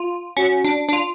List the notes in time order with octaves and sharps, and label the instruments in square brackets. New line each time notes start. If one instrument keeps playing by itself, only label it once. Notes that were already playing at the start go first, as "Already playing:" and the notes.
Already playing: [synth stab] F4
[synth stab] C#4 [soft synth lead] F#4
[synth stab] D4
D4
F4